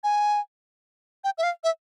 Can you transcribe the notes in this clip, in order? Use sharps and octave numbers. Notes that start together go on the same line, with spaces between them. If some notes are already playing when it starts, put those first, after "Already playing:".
G#5
G5
E5
F5
E5